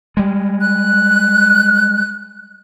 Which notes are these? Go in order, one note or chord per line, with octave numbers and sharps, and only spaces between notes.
G3 G#3
F#6